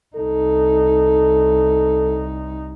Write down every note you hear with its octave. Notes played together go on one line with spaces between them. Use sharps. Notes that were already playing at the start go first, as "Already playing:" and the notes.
C2 D#4 A4